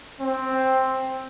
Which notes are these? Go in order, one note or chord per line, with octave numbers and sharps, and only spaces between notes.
C4